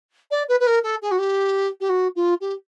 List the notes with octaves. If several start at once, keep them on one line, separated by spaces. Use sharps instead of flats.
D5
B4
B4
A#4
A4
G#4
F#4
G4
G4
F#4
F4
G4